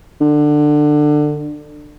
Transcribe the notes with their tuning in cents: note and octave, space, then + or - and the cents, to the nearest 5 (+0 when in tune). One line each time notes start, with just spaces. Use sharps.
D3 +20